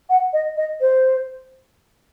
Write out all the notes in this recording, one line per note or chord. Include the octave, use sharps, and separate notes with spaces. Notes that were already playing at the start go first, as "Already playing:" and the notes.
F#5
D#5
D#5
C5